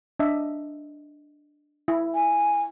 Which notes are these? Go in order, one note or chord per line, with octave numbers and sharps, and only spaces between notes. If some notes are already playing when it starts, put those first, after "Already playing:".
D4 D#5 E5
E4
G#5